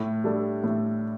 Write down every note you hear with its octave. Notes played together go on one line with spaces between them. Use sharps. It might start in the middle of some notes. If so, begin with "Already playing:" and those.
Already playing: A2
G3 D4 A4
A2